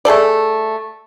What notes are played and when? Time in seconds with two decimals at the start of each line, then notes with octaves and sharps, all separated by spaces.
0.05 A3 G#4 A4 D5